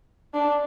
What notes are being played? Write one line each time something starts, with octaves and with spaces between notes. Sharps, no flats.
D4